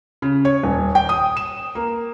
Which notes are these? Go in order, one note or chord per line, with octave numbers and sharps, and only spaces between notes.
C#3
C#5
D#1
G5
D#6
E7
A#3